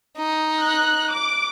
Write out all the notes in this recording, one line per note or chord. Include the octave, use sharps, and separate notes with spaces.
D#4
F#6
D6